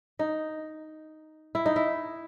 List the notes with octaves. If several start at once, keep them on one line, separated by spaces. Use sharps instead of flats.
D#4
E4
D#4
E4